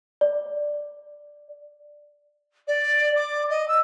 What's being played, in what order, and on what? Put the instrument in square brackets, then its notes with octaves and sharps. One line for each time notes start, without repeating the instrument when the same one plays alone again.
[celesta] D5
[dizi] D5
D6
D#5
E6